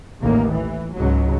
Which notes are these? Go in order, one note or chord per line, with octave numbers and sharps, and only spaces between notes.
A1 D#2 A#3
E3
C#2 G#2 F#3